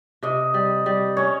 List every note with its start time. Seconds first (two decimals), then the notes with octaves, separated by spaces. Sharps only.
0.23 C3 D#5
0.54 G3
0.86 G3
1.17 C#4 C#5